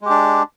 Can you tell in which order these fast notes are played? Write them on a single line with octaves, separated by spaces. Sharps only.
G#3 G4 D4